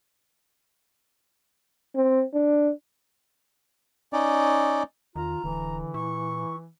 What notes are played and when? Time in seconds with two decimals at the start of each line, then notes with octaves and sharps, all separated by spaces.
1.96 C4
2.34 D4
4.13 C#4 D#4 D5
5.16 E2 D#3 F4 A#5
5.44 D1 D3 E3
5.94 A#2 E4 C#6